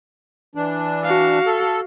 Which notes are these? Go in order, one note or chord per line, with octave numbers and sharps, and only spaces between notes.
E3 D4
F#4 F5
A4